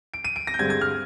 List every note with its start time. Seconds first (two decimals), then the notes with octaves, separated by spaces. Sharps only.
0.14 D7
0.25 D#7
0.36 D7
0.47 A#6
0.54 G6
0.59 G2 D3 G#3 C4 G#6
0.70 G#6
0.81 F6